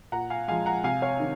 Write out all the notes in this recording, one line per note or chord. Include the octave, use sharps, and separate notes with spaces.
A#2 F#5 A#5
F5 G#5
F3 G#3 F5 G#5
F#5 A#5
C3 F5 G#5
C#5 F5
D#3